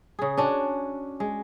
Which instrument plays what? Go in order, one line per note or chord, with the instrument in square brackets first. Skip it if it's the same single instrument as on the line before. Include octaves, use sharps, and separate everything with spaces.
[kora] C#3 G#4
C#4 D4 F#4
G#3